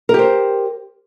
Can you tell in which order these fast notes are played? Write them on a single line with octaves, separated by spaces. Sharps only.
A#4 G4 C5